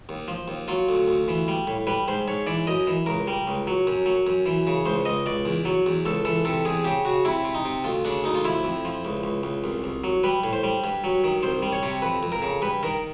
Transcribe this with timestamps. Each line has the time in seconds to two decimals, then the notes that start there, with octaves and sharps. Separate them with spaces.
0.09 D#2
0.28 F3
0.48 D#2
0.68 F#3 F4
0.89 D2
1.08 D2
1.28 E3
1.48 G3
1.67 A2
1.87 G3 B4
2.08 G#2 C5
2.28 G#2 C#5
2.47 E3 D5
2.67 F#2 D#5
2.87 E3
3.06 C#2 A#4
3.28 G3
3.47 C#2
3.67 F#3
3.87 F#2
4.06 F#3
4.27 F#2
4.46 E3
4.67 C#3
4.86 C#2 C5
5.05 C#2 D#5
5.26 C#2 D5
5.45 E2
5.65 F#3
5.86 E2
6.05 C#2 A4
6.25 E3 A4
6.45 C3 A4
6.65 E2 G#4
6.85 C#3 G4
7.05 C#3 F#4
7.25 C3 E4
7.45 C3
7.55 D#4
7.65 C3
7.84 D2 F4
8.05 C#3 D4
8.24 D2 D#4
8.35 F4
8.45 F3 E4
8.64 F2
8.85 F3
9.05 C#2
9.23 C#2
9.43 C#2
9.64 C2
9.84 C2
10.04 F#3
10.23 G3 B4
10.43 A2
10.53 C5
10.64 G3
10.84 G2
11.04 F#3
11.24 D#3
11.43 C2 C5
11.62 G3
11.73 C#5
11.83 C3
12.02 F2 B4
12.23 F2
12.32 A#4
12.42 C#3
12.62 G2 B4
12.83 D#3 A#4